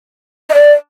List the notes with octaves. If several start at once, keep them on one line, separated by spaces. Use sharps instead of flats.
D#5
D5